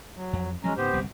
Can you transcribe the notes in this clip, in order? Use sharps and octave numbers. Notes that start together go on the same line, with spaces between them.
F#3
F2
F3 F#3 G#3 C#4 A#5
G#2 C#3 B3 G4 C5
G1 C2